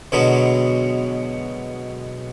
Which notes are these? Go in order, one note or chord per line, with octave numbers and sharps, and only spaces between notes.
B2 D3 F#3 G#3 B3